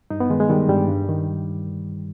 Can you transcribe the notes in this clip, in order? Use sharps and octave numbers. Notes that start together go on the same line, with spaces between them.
G2 D#4
B3
D#3 G#3
G#3
D#3 G3
G2 G3
G2
D#3